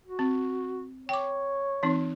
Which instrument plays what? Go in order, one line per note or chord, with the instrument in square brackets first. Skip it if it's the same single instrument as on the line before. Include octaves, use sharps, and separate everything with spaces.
[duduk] F#4
[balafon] C4
[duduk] C#5 [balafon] G5 D6
[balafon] E3 C4 D#4